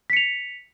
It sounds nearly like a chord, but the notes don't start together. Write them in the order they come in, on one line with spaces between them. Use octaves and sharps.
B6 C#7 F7